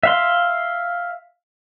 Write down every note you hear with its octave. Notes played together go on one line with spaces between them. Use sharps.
E5 F5 C6